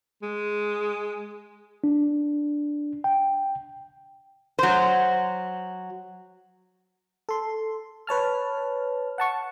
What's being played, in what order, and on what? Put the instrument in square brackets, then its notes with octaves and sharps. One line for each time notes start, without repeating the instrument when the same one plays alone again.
[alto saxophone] G#3
[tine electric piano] D4
G5
[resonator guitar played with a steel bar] F#3 C5
[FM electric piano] A4 C6
B4 C#5 A5 F6
F#5 A5 C#6